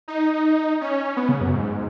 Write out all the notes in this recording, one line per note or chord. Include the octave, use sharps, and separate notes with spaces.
D#4
C#4
B3
C#3
F#2
G#2